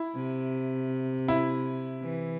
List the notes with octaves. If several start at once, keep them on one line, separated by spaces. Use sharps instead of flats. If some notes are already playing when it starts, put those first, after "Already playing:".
Already playing: E4
C3
E4
E3